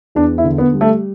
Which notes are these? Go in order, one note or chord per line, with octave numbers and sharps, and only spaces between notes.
E2 D4
E4
D3
B3
G3
A3